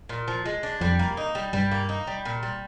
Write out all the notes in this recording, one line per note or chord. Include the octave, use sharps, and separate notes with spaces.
A#2
F3
G#3
D4
F2 G3
A#3
D#4
G3
G2 G3
A#3
D#4
G3
A#2
G3